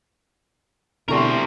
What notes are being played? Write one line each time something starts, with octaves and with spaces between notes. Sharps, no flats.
B2 D3 G3 A3 C4 E4 A#4